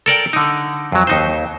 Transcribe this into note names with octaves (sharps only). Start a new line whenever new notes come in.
A4 A#4 D5 G5
D3 D#4
F2 F#3
D#2 D#4 C5